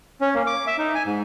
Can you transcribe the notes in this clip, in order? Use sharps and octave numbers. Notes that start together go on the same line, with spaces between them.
C#4
A#3
D6
E5
D#4
G#5
G#2